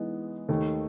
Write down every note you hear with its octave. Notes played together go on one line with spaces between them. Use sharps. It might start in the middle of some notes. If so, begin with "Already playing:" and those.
Already playing: E3 G#3 B3 D#4
D#2 D#3 A3